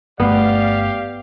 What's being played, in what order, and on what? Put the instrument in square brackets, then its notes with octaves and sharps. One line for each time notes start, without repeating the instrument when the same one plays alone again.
[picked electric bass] G1 A3 [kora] B3 [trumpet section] G4 F5 [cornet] D5